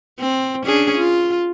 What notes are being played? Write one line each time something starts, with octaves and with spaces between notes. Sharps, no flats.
C4
C#4 D4 G#4
F4